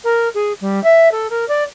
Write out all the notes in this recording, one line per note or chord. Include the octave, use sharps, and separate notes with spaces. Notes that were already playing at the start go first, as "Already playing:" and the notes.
A#4
G#4
G3
E5
A4
A#4
D5